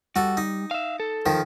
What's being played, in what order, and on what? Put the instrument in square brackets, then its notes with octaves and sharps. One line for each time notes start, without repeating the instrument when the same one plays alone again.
[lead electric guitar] G3 [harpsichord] F#4 A4
[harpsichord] D#4
[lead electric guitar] E5 F5
A4
[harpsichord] D#3 F3